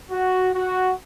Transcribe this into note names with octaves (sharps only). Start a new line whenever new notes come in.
F#4
F#4